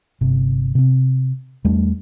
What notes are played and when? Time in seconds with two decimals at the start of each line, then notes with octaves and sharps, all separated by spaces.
0.21 G1 C3
0.75 C3 C4
1.64 E2 G3 A3 D4